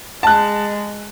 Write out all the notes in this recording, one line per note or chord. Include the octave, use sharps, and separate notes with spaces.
G#3 A5 F#6